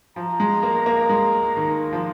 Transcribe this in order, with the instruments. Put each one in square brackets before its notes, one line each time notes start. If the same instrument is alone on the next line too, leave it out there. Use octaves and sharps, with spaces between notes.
[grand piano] F3 [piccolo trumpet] A#5
[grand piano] G#3
A#3
A#3
G#3
D#3
F3